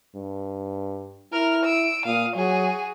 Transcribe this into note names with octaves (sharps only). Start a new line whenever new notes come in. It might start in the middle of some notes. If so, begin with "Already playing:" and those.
G2
E4 A#4 F6
E6 D7
A#2 F5 D#6
F#3 F#4 G#4